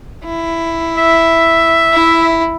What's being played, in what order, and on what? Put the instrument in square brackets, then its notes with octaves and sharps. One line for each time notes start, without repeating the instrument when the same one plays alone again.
[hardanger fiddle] E4
[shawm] E5
[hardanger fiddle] E4